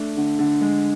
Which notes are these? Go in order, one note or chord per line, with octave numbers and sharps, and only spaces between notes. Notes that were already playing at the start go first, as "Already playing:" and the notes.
Already playing: A3 D4
D3
D3
G#3